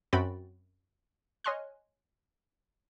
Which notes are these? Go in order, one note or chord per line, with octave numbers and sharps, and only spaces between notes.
F#2 C4 F#4 G5 B5 A6
C#5 D#5 G#5 C6 F6 F#6